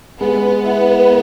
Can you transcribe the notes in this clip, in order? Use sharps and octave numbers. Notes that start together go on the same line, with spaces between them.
G#3 B3
E4